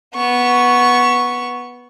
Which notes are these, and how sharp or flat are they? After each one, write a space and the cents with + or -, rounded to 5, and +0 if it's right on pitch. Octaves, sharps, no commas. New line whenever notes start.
B3 -10 C#6 +0